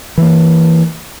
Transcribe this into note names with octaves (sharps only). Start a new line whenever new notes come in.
E3 A#3